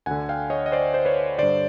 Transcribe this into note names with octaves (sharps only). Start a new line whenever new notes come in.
D2 D3 F#5 G#5
F5 G5
C#5 D#5
D#5
C5 D5
C5
B4 C#5
G2 D3 C5 D5